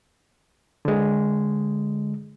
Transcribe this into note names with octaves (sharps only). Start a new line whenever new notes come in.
D3 G#3